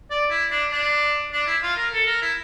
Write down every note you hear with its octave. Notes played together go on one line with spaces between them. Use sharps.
D5
E4
D4
D4
D4
E4
F4
A#4
A4
A#4
E4